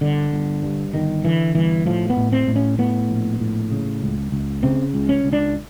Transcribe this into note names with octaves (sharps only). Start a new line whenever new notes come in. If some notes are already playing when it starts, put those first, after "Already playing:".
G1 D3
G1
G2
G1 D#3
D3 E3
G1 E3
A2 F3
B3
A2
C4
A2
C#4
A2 B3
A#1
A2
C#3
C#2
C#2
C#3 C4
C#2
C#4
C#2
D4